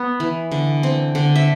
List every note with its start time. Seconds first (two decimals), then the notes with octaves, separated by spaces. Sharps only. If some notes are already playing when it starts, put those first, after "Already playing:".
Already playing: B3
0.20 E3
0.52 D3
0.83 C4
1.15 D3
1.36 E5